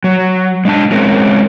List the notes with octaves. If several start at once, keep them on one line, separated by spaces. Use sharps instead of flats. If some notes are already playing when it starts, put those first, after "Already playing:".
F#3
G#3 D4 A5
G#3 C4 C#4 A#4